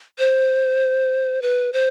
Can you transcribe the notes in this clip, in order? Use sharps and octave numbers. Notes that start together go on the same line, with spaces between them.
C5
B4
C5